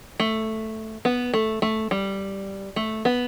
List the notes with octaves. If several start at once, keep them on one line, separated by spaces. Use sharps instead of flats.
A3
B3
A3
A3
G3
A3
B3